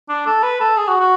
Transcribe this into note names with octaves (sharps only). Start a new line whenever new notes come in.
D4
A4
B4
A4
G#4
F#4
F#4